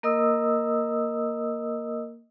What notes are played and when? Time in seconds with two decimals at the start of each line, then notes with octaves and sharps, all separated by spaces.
0.03 A#3 A#4 D#5 D#6 E6